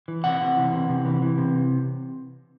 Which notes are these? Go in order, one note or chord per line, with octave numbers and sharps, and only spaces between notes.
E3
C3 F#5
C3
E3
C3
C3
E3
E3
C3